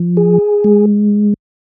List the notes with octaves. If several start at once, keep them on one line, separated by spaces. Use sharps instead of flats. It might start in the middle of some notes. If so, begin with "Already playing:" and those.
Already playing: F3
G#4
G#3